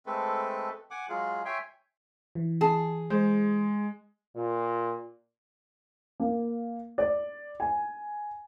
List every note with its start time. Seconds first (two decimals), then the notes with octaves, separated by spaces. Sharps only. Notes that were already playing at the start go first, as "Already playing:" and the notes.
0.06 G#3 A3 C4 A4 B4
0.91 F#5 G#5 D6
1.09 F#3 G#3 F4 G#4
1.45 C#5 E5 G5 G#5 C6
2.35 E3
2.61 G#4 A5
3.10 G#3 C5
4.36 A#2
6.20 A#3
6.98 D5
7.60 G#5